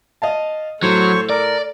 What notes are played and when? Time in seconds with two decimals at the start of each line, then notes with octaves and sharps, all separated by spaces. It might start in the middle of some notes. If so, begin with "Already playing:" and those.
0.22 D#5 F5 A5
0.83 A2 F#3 A4 C5 C#5 C#6
1.30 A#4 D5